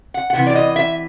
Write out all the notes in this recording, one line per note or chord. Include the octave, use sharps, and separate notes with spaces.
F#5
F#5
C3 E3
D5
D#5
E5